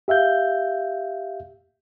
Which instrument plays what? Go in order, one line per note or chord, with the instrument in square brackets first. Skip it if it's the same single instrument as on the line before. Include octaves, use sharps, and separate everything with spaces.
[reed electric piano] G4 E5 F5 G6